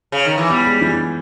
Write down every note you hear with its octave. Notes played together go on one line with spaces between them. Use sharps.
C#3
D#3
E3
G3 B3
G#3
E3